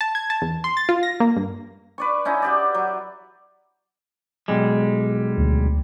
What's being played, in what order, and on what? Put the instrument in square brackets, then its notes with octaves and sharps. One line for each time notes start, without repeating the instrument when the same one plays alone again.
[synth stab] A5
G#6
A5
E2
C6
A6
F4
A#6
A#3
G2
[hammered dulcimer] B4 D5 C#6
C#4 D#4 E4
F#4 G4 D5
F#3
[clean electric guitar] B1 G3 G#3
[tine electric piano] D2